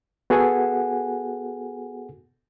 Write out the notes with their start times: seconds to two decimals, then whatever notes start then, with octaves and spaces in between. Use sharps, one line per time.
0.30 B3 F#4 G#4 A4 F#5 G#5